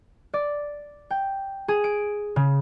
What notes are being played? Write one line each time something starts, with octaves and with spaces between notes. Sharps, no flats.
D5
G5
G#4
D7
C#3